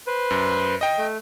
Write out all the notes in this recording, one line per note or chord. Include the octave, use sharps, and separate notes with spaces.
B4 C5
F#2
D#5 G5
A3